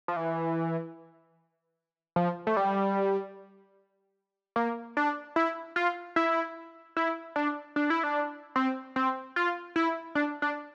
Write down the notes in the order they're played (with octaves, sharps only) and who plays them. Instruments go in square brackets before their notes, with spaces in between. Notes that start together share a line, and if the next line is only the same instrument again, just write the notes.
[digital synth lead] F3
E3
F3
A3
G3
A#3
D4
E4
F4
E4
E4
D4
D4
E4
D4
C4
C4
F4
E4
D4
D4